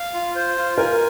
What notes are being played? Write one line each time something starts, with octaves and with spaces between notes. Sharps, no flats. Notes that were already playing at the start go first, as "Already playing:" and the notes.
Already playing: F5
F4
C5
F4
A#4 G#5